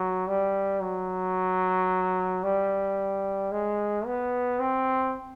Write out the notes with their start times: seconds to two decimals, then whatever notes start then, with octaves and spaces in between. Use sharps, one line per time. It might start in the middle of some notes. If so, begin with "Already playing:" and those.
Already playing: F#3
0.28 G3
0.82 F#3
2.43 G3
3.51 G#3
4.06 B3
4.60 C4